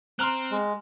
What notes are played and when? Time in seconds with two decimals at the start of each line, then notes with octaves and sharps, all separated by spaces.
0.19 C4 A#5 C6 F6 F#6 F#7 G7
0.51 G#3